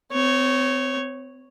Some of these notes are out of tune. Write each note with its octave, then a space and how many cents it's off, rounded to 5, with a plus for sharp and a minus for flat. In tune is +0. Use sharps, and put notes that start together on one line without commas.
C4 -35 C#5 +0